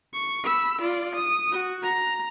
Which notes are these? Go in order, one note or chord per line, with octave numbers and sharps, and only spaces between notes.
C#6
B5 E6
F4 D5
D#6
F#4
A#5